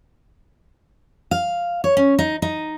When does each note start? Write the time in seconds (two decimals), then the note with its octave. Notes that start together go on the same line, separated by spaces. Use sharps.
1.31 F5
1.84 C#5
1.97 C#4
2.19 D#4
2.42 D#4